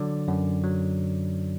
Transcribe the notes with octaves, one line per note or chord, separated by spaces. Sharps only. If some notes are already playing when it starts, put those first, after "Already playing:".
Already playing: D3 F#3 D5
F#2
F#3